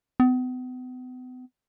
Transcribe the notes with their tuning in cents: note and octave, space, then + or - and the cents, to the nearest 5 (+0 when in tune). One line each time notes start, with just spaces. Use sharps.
B3 +40